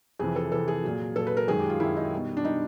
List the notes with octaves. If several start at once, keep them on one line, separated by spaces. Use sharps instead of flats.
F2 C3 E3 G#4
A4
F2 C3 E3 A4
G#4
A#2 F#3
A#2 F#3 A4
B4
A#4
F#2 D#3 G#3 G#4
G4
F4
F#2 D#3 G#3 E4
D#4
B2 G3
D4
B2 G3 D#4